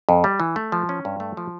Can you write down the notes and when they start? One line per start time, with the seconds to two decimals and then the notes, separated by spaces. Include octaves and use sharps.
0.09 F2
0.24 G3
0.40 E3
0.56 A3
0.72 F3
0.89 C#4
1.05 G2
1.20 A3
1.37 F3